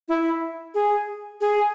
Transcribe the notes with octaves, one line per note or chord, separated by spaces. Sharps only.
E4
G#4
G#4